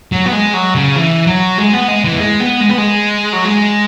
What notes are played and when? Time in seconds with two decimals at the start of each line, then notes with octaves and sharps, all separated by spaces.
0.12 F#3
0.26 B3
0.32 G#3
0.54 F#3
0.75 C#3
0.96 E3
1.27 F#3
1.58 G#3
1.73 B3
1.88 G#3
2.05 E3
2.13 B3
2.20 G#3
2.40 B3
2.61 G#3
2.69 B3
2.78 G#3
3.33 F#3
3.45 G#3